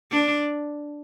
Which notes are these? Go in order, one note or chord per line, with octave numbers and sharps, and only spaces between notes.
D4